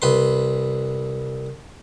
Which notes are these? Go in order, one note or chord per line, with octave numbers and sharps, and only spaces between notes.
C2 B4 C6